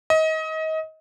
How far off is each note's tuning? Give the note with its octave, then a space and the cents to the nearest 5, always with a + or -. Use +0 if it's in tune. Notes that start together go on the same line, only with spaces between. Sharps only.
D#5 +30